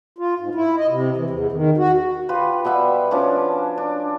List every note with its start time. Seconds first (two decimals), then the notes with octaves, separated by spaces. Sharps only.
0.18 F4
0.39 G#2
0.55 E4
0.77 D#5
0.88 C3
1.17 E3
1.30 E2
1.52 D#3
1.77 F#4
2.29 F4 G4 B4
2.65 B2 G3 E5 F#5
3.11 F3 C#4 D4 D6
3.78 D4